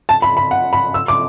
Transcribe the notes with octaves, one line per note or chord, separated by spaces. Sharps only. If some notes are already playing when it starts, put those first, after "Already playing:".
A5
B5
B5
F#5
B5
E6
D6